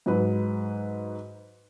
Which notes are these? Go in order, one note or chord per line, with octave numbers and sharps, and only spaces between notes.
G#2 F#3 B4